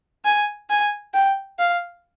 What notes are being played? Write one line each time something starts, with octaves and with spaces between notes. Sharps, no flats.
G#5
G#5
G5
F5